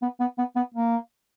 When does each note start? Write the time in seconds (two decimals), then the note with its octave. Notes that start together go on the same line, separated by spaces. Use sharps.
0.02 B3
0.20 B3
0.38 B3
0.56 B3
0.74 A#3